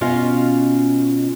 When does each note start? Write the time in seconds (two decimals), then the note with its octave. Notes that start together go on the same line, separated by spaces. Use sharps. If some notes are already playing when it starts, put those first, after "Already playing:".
0.01 B2 C#4 F4 D#5 F5